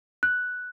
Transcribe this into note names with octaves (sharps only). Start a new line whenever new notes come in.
F#6